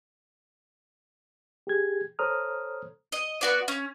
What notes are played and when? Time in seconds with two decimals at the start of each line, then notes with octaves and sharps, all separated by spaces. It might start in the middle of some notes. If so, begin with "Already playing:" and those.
1.67 G4 G#4 G#6
2.19 A4 C5 C#5 A#5 D#6 F6
3.12 D#5
3.41 B3 F#4 D5
3.68 C#4